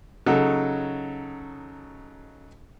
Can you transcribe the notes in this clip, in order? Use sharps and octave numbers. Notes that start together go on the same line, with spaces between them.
C#3 F#3 D#4 A4